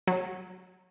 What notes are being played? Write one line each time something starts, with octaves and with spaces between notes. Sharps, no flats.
F#3